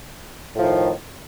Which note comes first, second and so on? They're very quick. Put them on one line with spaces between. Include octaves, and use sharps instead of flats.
A2 F3 D#3